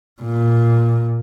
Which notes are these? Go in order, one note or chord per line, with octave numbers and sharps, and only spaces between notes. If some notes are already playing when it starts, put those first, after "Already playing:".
A#2